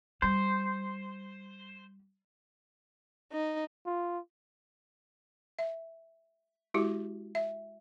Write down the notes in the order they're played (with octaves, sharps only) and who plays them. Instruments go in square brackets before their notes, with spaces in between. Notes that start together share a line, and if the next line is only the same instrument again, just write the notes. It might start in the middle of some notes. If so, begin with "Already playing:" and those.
[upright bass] G3 [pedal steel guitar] C5
[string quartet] D#4
[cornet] F4
[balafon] E5
G#3 E4 F#4 G4
E5